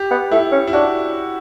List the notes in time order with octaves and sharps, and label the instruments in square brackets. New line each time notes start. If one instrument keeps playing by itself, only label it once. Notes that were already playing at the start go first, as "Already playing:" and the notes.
Already playing: [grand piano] G4
[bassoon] B3
[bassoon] A3 [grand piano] E4
[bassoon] C#4
[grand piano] E4
[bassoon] D4 [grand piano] F#4